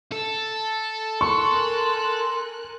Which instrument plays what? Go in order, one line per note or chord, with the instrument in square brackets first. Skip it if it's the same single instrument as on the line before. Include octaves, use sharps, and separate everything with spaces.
[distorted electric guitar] A4
[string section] A#4 G#5 F#6 [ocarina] C6 [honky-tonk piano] C#6